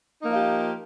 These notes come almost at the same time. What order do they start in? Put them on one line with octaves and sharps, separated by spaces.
D#4 A#3 F3 F4 G4